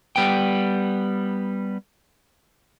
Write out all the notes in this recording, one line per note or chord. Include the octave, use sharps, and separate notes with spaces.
G3 B3 G5